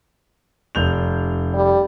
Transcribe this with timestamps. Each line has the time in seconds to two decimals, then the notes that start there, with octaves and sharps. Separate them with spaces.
0.75 F1 G6 F7
1.54 G3